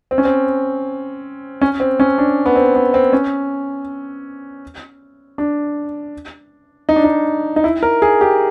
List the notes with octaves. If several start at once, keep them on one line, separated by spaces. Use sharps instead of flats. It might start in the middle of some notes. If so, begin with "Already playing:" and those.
C4
C#4
C4
C#4
C4
C#4
D4
B3
C4
B3
C4
C#4
D4
D#4
D4
D#4
D#4
E4
A#4
G#4
G4